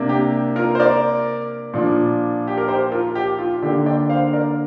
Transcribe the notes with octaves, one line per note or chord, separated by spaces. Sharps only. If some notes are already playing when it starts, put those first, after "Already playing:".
Already playing: C3 A#3 D4
G4
F4 A#4
C5
A#4 D5
A#2 F3 D4
G4
A#4
G4 C5
F4 A#4
G4
F4
D3 A#3 D4 G4
D5 G5
C5 F5
A#4 D5